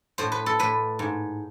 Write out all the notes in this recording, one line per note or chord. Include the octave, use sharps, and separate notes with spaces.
A2 C5
B4
A4
A2 B4
G#2